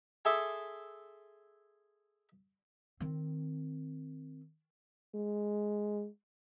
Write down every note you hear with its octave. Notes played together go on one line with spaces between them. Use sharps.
G#4 A4 E5 C6 D6
D#3 C4
G#3